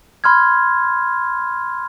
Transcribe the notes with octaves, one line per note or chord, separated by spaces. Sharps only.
B5 C6 F6 G#6